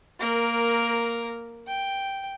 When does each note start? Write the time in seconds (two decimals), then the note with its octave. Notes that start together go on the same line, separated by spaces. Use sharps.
0.19 A#3 A#4
1.67 G5